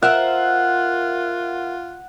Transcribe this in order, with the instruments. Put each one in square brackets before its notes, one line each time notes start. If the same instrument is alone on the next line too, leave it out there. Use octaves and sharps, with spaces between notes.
[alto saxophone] F4 [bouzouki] A#4 C5 E5 [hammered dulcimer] F#5